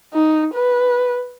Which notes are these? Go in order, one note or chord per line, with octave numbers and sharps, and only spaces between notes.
D#4
B4